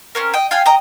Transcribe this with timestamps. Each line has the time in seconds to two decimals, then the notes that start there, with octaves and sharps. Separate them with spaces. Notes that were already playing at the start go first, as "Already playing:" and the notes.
0.15 C4 C#4 A#4
0.34 D#5 G5
0.51 F4 F5 G5 G#5
0.66 D#5 G5 A#5 D#6